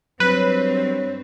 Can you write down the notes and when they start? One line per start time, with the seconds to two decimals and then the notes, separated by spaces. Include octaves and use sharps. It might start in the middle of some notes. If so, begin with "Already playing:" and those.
0.20 G2 F#3 C4 B4 C#5